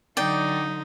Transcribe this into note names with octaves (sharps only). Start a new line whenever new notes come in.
D3 F#3 D#4 D5 G5